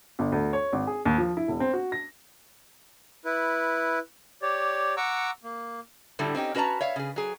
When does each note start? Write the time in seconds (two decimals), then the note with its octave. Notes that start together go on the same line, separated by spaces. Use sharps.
0.19 G1
0.32 D2
0.53 C#5
0.73 G#1
0.87 G#4
1.05 D#2
1.18 F3
1.37 E4
1.48 E1
1.60 C4
1.73 F#4
1.92 A#6
3.25 E4 B4
4.42 G4 C#5 D5
4.97 F#5 A#5 C#6 D6 E6
5.43 A#3
6.19 A2 D3 G3 A3 E4 F#4
6.35 C4 C#4 D#4 G4
6.55 C#4 F#4 B4 D5 A5 A#5
6.81 C#5 E5 F5
6.96 C#3 G#4
7.16 F#3 G#4